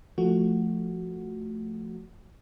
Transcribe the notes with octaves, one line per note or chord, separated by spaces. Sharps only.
F3 A3 F#4